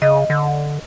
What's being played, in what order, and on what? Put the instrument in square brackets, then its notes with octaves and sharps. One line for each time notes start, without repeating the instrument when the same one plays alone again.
[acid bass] C#3 [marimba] D#5
[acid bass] D3